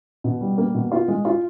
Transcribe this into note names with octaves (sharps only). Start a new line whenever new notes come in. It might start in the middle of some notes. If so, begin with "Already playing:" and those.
B2
G3
A#3
B2
F4
G#3
F4